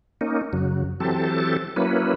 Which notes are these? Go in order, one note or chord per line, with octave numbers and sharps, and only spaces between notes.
A#3 C#4 D#4
F#2 C#3 F#3
E3 F#3 C4 G4 A4 A5
F#3 A#3 C#4 E4 B4